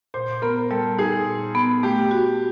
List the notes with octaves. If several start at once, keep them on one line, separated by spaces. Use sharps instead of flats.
A#2 C5
B3 A#4
G3 A4
D#4 G#4
A#2
B3
A3 G4
F#4